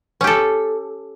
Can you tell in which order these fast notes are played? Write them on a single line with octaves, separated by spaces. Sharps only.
C#4 G4 A4